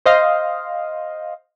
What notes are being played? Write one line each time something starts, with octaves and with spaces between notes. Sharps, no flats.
C5 D#5 F5